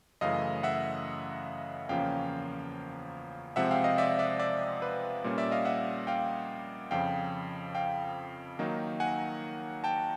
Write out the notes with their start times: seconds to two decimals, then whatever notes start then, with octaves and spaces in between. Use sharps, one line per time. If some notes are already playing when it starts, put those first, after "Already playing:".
0.21 F#2 C#3 E3 A3 D#5 F5
0.63 E5 F#5
1.89 E2 C#3 F3 A#3 C#4 F5 G5
3.56 C3 F3 G#3 C4 E5 F#5
3.71 F5 G5
3.84 D#5 F5
3.98 D5 E5
4.19 D5 E5
4.40 D5 E5
4.82 B4
5.24 A#2 G3 A#3 C#4
5.38 D5 E5
5.51 D#5 F5
5.65 E5 F#5
6.07 F5 G5
6.91 F2 C#3 F3 F5 G5
7.75 F5 G5
8.59 D#3 F#3 A#3 D#4
9.00 F#5 G#5
9.84 G5 A5